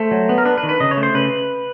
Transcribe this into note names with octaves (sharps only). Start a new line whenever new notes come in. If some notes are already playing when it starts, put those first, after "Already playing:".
Already playing: A3 C5
F#3
B3
A#4
D4 B4
B4
D#3
B4
C#3 D#5
C#5
A3
C5
C#3 B4